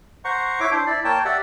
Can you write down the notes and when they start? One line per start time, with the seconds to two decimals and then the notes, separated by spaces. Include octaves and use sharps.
0.25 C5 F#5 A#5 C#6
0.60 E4 C#5 D6
0.71 D4 C5
0.87 E4 D5
1.05 A#3 C#5 G5 A5
1.25 G4 D5 E5 F#5